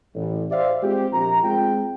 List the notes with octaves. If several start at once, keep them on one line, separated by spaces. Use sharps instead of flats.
A1
G4 C5 D5 E5 F5
G#3 C4 F4 G4
A#1 A#5
G#3 C4 F4 G5